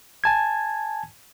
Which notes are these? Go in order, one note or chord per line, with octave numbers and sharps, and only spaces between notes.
G#5 A5 G#6